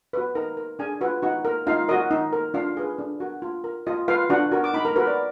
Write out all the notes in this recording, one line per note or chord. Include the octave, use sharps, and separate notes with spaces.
F#4 B4
D#4 A#4 A#5
A#4
D4 G#4 G#5
F4 F#4 B4 F#5
D#4 F#4 F#5
A#4
D#4 F4 F5
F#4 A#4 D#5
D#4
A#4
D4 F4 F5
G#4 B4
D4
F#4 A#4
F4
A#4
F4 D#5
F4 B4 F5
D4 F#4 F#5
F#4 A#4
D6
D#4 B5
A#4 A#5
F#4 A#4 B4 B5
D5 D6